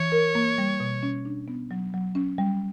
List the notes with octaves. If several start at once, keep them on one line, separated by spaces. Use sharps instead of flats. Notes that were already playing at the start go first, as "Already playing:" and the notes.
Already playing: E3 C#5
A#4
A#3
G3
B2
C#4
D4
B3
F#3
F#3
C#4
G3